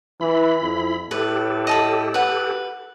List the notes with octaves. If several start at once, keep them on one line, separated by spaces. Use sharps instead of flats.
E3 E4 B5
F2
A2 G4 A4 B4
D#5 A5 B5
B4 F#5